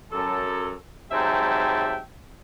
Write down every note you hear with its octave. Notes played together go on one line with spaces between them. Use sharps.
F#2 A4
G#2 C3 F#3 E5 G5 A5